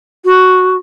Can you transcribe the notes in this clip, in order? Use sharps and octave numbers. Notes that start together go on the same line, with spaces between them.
F#4